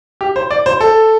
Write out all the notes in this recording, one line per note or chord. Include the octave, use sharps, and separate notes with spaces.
G4
C5
D5
C5
A4